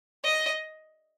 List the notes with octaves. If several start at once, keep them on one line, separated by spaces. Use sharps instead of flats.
D#5